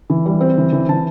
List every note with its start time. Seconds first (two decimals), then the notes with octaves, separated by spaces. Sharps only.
0.10 E3
0.26 G3
0.41 C4
0.58 E3
0.73 E3
0.89 E3 A5